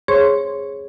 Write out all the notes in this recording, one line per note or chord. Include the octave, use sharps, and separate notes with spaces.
G#4 C5 C#5 C6 C#6